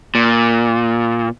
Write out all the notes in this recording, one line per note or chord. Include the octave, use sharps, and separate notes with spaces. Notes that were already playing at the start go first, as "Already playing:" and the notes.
A#2